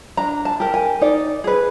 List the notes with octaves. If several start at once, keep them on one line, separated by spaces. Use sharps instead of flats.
D4 A#5
A5
G4 A#4
G#5
D#4 D5
G#4 B4